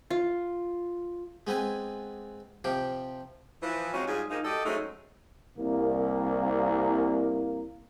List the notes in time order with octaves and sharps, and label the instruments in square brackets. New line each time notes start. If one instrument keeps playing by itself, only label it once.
[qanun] F4
[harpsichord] G#3 B3 C4 B4 G#5
C3 F3 G4
[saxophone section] E3 F3
G#3 C4 C#4 D#4 F4 F#4
G#2 G3 F4 G#4
G#2 F3 G#3 A#3 D#4 F5
F#4 G4 A4 D#5
F#3 G#3 A3 C4 C#4 D#4
[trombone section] C2 A#3